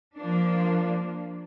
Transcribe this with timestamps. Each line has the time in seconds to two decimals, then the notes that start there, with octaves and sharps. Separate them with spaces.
0.15 F3 A#3 D4